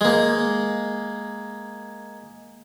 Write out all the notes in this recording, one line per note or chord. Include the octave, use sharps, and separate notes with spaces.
G#3 A#3